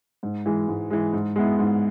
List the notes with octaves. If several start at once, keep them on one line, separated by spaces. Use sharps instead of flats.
G#2
E3 G#3
G#2
E3 G#3
G#2
G#3 B3 E4
G#2